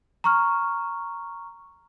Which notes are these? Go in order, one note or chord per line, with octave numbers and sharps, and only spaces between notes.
A#5 C#6 F6